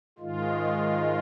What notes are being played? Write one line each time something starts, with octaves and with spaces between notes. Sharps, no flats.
G#2 D#3 G#3 F4